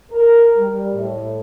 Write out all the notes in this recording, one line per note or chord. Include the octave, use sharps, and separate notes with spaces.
A#4
G3
A2